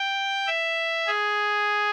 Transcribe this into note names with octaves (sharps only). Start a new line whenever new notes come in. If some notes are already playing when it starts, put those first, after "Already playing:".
Already playing: G5
E5
G#4